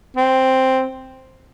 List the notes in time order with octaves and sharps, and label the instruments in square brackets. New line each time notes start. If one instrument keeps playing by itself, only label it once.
[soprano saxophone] C4